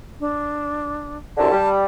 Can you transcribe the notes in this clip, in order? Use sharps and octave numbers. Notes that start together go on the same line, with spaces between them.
D4
C2 F#2 D3 A5
G3